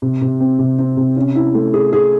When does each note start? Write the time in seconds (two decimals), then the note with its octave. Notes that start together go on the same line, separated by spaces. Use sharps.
0.02 C3
0.21 C3
0.40 C4
0.59 C3
0.78 C4
0.97 C3
1.16 C#4
1.35 E4
1.55 A3
1.74 G#4
1.93 G#4